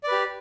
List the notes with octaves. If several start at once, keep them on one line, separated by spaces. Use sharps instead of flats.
G4 B4 D5